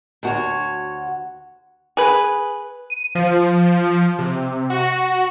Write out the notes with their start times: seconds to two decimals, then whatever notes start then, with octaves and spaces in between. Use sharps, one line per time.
0.23 D2 F#4 C#5
1.97 G#4 B4
2.90 D#7
3.15 F3
4.19 C3
4.70 F#4